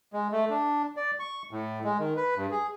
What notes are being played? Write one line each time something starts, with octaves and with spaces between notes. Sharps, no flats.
G#3
A3
D4
D5
C#6
A2
G#3
D#3
B4
G2
G#4